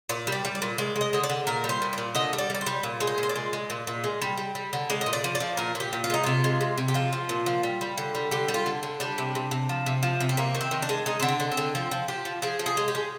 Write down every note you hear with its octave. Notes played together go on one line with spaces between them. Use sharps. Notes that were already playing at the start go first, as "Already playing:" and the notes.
A#2 D5
G3
D5
G3
D5
A#2
G#3 D5
G#3
D#5
D3 D#5
D5
D3
A#2 A#4
G3
C5
A#2
A#2 D5
D3 D#5
G3
D5
G3 D5
C5
G3
A#2
G#3
C5
A#2
C5
D5
G#3
G#3
A#2
A#2
G#3
G3
G3
G3
D3
G#3 D5
D#5
A#2
D5
F3
D5
F3
A#2 A#4
A#2
G4
A#2
F4
G#3 D#4
C3 F4
G#3
C3
C3
G4
F3 F4
F3
A#2
F3
G3
G3
D3
G3
D3 G4
G3
F4
D3
D3
G3 D4
C3
C3
C3
F3
C3
F3
C3
C4
C3 A#3
D#3
C4
D#3
D4
G#3
G#3 D#4
D3 C4
D4
D3
C4
D3
F3 C4
F3
F3 G4
F3
F3 G#4
F3
G#4
G#3
G4
G#3